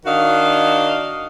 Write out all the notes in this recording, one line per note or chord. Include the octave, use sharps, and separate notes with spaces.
D#3 D4 F#4 D#5 F5